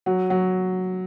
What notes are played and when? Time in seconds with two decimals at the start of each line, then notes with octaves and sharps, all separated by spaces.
0.06 F#3
0.30 F#3